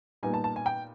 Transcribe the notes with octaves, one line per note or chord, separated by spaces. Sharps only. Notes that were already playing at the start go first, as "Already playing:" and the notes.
A#2 G3 B3 D#4 G#5
A5
A5
G#5
G5